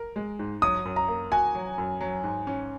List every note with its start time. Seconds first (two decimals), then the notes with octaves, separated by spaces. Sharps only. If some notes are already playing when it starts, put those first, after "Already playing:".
Already playing: A#4
0.16 G#3
0.39 G#2
0.62 F#3 D#6
0.85 F#2
0.96 A#5
1.08 A#3
1.31 F#4 G#5
1.55 F#3
1.78 F#2
2.01 F#3
2.24 G#2
2.47 C#4